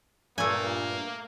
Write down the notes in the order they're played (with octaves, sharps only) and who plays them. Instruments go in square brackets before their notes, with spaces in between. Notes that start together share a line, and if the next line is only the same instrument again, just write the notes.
[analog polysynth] G2 A#2 [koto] A3 G#5 [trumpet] A#3